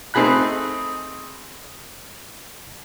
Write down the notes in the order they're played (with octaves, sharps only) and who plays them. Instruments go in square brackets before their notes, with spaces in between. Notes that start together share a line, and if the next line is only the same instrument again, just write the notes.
[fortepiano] A3 C4 D#4 G#4 B5 F#6